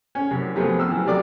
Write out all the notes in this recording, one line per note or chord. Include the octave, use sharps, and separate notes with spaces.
C#4
C2 F#2
C3 F3 F#3 A3 B3 G#4
E6 F6
E3 F#3
C3 F#3 A#4 D5 D6